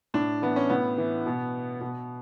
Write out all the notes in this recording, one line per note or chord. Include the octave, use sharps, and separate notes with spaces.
A2 D4
E3 B3
C#4
A2 B3
E3
B2
B2